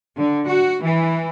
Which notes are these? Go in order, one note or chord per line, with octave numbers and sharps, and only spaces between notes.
D3
F#4
E3